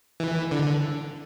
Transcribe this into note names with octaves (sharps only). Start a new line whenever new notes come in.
E3
D3